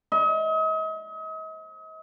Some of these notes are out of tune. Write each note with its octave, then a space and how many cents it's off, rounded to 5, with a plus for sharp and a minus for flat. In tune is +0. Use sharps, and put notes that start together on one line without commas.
D#5 +40